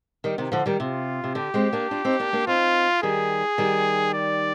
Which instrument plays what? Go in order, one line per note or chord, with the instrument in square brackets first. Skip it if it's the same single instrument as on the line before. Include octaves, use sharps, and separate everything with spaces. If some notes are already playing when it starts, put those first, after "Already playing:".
[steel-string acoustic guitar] D#3 G3
C3 D#3
D3 F3
D#3 G3
[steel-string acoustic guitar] C3 [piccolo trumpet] F4
[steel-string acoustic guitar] C3
[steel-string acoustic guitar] D3 [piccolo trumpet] G4
[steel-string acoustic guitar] G#3 C4
A#3 D4
D4 F4
C4 D#4
A#3 D4
A#3 D4
[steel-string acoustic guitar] C4 D#4 [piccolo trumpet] F4
[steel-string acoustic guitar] D#3 G3 [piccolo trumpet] G#4
[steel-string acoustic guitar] D#3 G3
[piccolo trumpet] D5